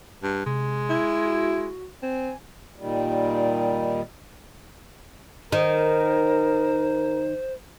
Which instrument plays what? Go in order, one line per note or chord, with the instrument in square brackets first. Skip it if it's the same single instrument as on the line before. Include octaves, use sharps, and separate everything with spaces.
[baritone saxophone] G2
[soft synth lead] C3 [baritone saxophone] G#3
[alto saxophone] E4
[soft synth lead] F#4
[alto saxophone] C4 [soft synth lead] G#5
[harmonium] A#2 D#3 G3
[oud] D#3 [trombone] A#4 [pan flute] C5